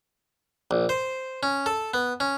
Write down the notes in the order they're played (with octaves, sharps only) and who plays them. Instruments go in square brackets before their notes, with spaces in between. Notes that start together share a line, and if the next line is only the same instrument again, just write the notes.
[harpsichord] A#1
C5
C#4
A4
B3
C#4